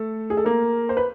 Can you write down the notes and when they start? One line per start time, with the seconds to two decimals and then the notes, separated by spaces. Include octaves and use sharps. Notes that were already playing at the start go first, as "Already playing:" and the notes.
Already playing: A3 A4
0.30 G#4
0.37 A4
0.45 A#3 A#4
0.89 C5
0.97 B4